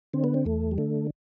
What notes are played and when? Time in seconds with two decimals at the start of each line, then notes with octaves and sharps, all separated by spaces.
0.13 D3 C4
0.24 B3
0.34 C4
0.46 E2 A3
0.71 G3
0.78 D3 A3